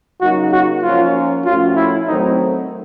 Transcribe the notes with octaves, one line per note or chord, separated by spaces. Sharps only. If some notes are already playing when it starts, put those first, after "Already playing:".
C#3 F#3 A#3 D#4 F#4
F#4
F3 A#3 C#4 F4
A2 F3 A3 C#4 F4 F#4
E4
D#3 F#3 A3 C4 D#4